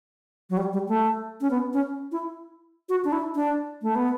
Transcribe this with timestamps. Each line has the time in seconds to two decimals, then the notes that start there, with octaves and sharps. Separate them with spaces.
0.50 F#3
0.57 G3
0.73 G3
0.88 A3
1.41 C#4
1.50 B3
1.73 C#4
2.12 E4
2.89 F#4
3.05 D4
3.12 E4
3.35 D4
3.82 A3
3.95 B3